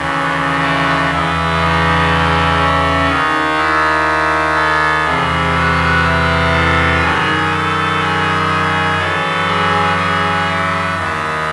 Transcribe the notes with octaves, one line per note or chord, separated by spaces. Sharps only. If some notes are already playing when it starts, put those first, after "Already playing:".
Already playing: D#2 C#3 E3
E4
E2 C#3 E3 E4
D#4
C#4
D#2 D#3 D#4
E4
A4
E2 C3 E3 G#4
F#4
E4
A4
F#2 D#3 G#4
A4
G#4
F#2 E3 A4
G#4
G#4
E4
D#2 D#3